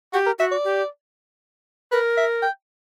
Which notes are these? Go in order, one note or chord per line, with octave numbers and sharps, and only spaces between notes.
F#4 G4
A#4
F#4 E5
D5
G4
A#4 B4
E5
G5